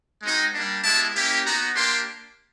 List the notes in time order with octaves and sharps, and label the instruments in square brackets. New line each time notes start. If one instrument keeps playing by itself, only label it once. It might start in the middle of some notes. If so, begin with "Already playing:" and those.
[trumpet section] G#3 C4 D#4 F#4
G3 A#3 D4
G#3 B3 E4 G4 A5
A#3 C#4 E4 G4
B3 D#4 F#4 A#5
A#3 D4 G4 C6